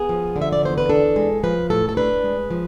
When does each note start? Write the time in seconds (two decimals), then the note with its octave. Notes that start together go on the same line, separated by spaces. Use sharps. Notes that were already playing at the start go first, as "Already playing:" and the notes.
Already playing: B3 G#4
0.09 F3
0.36 D3
0.42 E5
0.53 D5
0.63 E2 C5
0.78 B4
0.89 D4 A4
1.16 G#3
1.43 F3 B4
1.70 A2 A4
1.89 A4
1.97 D4 B4
2.24 G#3
2.51 F3